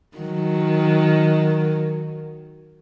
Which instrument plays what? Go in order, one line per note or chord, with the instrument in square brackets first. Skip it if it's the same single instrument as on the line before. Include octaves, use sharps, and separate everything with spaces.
[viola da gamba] D#3 F#3